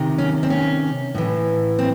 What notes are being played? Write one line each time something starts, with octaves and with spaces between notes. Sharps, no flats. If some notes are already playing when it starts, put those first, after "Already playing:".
Already playing: C3 D#3
C#4
C4
C#4
A2 E3
C4